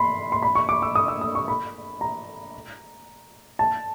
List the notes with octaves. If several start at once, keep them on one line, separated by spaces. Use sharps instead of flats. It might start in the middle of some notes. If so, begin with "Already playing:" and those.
Already playing: B5 C6
C6
B5
C#6
D6
E6
D#6
E6
D#6
C#6
B5
A#5
A5